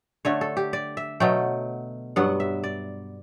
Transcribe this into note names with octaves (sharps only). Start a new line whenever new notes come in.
D3 A3 C#5
A4
G4
D5
E5
B2 F#3 A3 G5
G2 F#3 B3 F#5
E5
D5